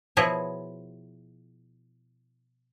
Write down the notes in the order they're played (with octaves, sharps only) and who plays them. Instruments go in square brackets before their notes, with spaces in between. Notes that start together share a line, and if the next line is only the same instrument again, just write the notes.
[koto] B2 F3 E4 F#4 G#4 C#5